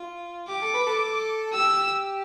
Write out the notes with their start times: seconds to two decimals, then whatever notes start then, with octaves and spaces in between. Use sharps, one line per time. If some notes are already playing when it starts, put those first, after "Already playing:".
Already playing: F4
0.48 G4 D6
0.61 A4
0.74 B4
0.87 A4
1.53 G4 E6